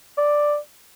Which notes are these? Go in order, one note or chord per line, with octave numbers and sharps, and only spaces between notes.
D5